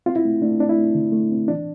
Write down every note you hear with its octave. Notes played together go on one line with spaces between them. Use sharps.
C4 F4
E4
A3
A3 D4
C4 D4
E4
A3
D3
A3
C4
E3 D4